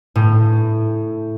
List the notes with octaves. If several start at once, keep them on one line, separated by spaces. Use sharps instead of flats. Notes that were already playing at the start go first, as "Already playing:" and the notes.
A2